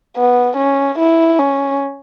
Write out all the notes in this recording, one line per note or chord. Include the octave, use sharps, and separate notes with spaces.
B3
C#4
E4
C#4